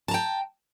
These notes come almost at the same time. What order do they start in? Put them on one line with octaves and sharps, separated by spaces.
A5 A#5 G5